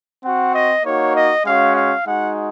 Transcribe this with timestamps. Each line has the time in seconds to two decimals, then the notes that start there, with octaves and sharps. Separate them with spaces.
0.23 C4 F#4 F#5
0.54 D#5
0.84 A#3 D#4 F#4 C#5
1.14 D#5
1.44 G#3 C#4 F#4 F5
1.75 F5
2.06 G#3 D#4 F#4 F#5